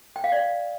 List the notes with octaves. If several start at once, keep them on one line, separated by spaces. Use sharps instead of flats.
G5
F5
D5